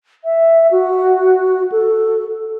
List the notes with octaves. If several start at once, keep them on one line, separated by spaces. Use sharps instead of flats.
E5
F#4
A4